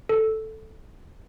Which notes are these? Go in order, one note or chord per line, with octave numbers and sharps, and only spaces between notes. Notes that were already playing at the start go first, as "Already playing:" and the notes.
A4